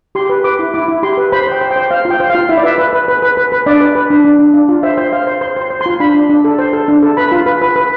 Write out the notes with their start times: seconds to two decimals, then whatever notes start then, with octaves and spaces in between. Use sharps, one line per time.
0.15 G4 C6
0.30 B4
0.44 B4 D6
0.59 E4
0.74 E4 D6
0.88 E4
1.03 G4 C6
1.18 B4
1.32 C5 B5
1.47 C5 G5
1.61 C5
1.71 G5
1.76 C5
1.91 C5 F5
2.05 F4
2.10 G5
2.20 C5
2.30 F4 F5
2.49 E4 E5
2.57 D5
2.64 B4 E5
2.78 B4
2.93 B4
3.08 B4
3.22 B4
3.37 B4
3.52 B4
3.66 D4 D5
3.81 B4
3.95 B4
4.10 D4
4.25 D4
4.39 D4
4.54 D4
4.69 F4
4.83 C5 E5
4.98 C5
5.12 C5 F5
5.27 C5
5.41 C5 C6
5.56 C5
5.62 C6
5.70 C5
5.81 F4 C6
6.00 D4 B5
6.15 D4
6.30 D4
6.45 A4
6.59 C5
6.73 A4
6.88 D4
7.03 A4
7.17 B4 B5
7.32 F4
7.46 B4
7.61 B4
7.76 B4